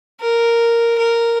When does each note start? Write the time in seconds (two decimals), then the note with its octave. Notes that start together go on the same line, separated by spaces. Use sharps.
0.20 A#4
0.98 A#4